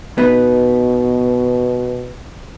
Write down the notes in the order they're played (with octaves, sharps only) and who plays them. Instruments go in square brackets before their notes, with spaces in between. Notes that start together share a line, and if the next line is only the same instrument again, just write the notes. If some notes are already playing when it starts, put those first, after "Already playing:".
[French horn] B2 [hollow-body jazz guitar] B3 D#4 B4